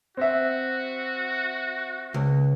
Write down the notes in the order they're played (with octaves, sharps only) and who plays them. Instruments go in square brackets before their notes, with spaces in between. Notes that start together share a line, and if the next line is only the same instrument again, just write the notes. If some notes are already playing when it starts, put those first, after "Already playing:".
[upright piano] C4 E5 [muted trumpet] F#4
[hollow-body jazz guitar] C#2